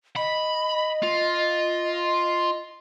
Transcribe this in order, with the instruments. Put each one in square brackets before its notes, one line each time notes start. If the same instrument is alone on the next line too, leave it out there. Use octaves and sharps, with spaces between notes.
[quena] D#5 [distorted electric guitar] B5
[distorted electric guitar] F4